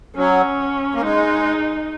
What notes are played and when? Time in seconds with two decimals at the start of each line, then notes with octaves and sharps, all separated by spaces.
0.15 F#3 C#4
0.95 A#3
1.02 G#3 D#4